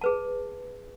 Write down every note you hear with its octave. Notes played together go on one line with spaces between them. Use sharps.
G#4 B4 A5